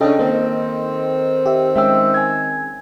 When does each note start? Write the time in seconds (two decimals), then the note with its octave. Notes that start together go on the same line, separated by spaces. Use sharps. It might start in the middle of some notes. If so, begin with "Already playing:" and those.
0.01 C#3 C#4 D4 A4 D#5 G5
0.19 D#3 A#3 C4
1.46 G4 E5
1.76 G#3 C#4 E5 G5 E6
2.14 G#5 G#6